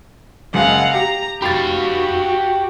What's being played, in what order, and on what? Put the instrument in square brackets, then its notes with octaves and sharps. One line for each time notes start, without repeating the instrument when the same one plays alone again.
[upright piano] F#1 C#3 G#3 [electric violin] F5 F#5
[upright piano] G4 [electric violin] A#5
[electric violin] F#4 [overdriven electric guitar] G4 F5 [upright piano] B5 A6